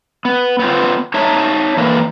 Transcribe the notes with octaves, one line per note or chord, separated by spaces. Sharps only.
B3
B3 C4 F4
D#4 C#5 E5 A5
D3 E3 A#3